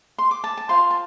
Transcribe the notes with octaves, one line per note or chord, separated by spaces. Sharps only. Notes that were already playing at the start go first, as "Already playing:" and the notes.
C6
D6
A5
A5
F4 C5 C6
A5